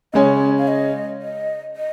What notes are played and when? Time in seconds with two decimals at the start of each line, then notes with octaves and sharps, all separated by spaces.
0.13 C#3 G#3 C#4 C#5 D#5
0.58 F5
0.68 D#5
1.22 D#5
1.76 D#5